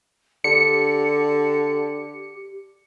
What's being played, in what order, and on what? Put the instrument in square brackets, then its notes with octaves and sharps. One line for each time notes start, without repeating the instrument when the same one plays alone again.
[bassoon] D3 [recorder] G4 [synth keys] C#7